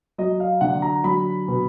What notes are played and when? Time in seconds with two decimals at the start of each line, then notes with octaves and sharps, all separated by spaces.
0.18 F#3 D#5
0.40 F5
0.61 D3 F#5
0.82 A#5
1.04 F#3 B5
1.48 B2